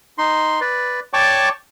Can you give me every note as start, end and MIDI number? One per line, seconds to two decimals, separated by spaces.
0.18 0.60 63
0.18 0.60 84
0.61 1.00 71
0.61 1.00 74
1.13 1.49 73
1.13 1.49 74
1.13 1.49 79
1.13 1.49 81
1.13 1.49 85
1.13 1.49 86